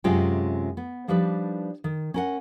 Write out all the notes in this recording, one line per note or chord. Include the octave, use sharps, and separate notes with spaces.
F#2 C3 G#3 C#4 F4 G5
B3
F3 G3 D4 D#4 B4
D#3
C#4 A#4 F#5